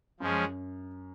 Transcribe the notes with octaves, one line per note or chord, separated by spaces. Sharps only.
F#2 F3 G#3 C#4